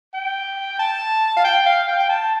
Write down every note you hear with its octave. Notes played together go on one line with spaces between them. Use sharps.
G5
A5
F5
G5
F5
G5
G5
A5